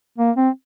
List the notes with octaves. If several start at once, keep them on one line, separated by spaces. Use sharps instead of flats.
A#3
C4